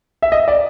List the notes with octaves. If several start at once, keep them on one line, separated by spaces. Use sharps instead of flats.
E5
D#5
D5